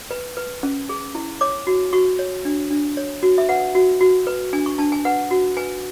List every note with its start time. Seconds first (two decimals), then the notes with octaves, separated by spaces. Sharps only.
0.11 B4
0.37 B4
0.63 C#4
0.89 G#4
1.15 E4
1.41 C#5 D6
1.67 F#4
1.93 F#4 C#6
2.19 C#5
2.45 D4
2.71 D4
2.97 C#5
3.23 F#4
3.38 E5
3.49 B4 F#5
3.75 F#4
4.01 F#4
4.27 B4
4.53 D4 G#5
4.66 C#6
4.78 D4 A5
4.92 G#5
5.05 B4 F#5
5.31 F#4
5.57 B4 G#5